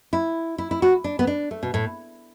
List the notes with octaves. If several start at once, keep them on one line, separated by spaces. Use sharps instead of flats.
E4
E4
E4
F#4
D4
B3
D4
A3
B2
A2